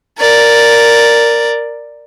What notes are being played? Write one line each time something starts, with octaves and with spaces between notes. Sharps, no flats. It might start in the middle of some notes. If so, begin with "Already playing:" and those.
A#4 D5